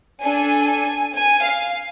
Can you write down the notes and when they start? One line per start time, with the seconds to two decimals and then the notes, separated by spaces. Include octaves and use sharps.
0.21 D4 A4 G#5
1.14 G#5
1.44 F5